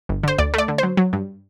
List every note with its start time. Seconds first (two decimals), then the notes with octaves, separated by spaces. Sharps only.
0.09 G1
0.23 D3 C5
0.38 D2 D5
0.54 A3 D5
0.68 D3
0.78 F#3 C5
0.97 F#3
1.13 G2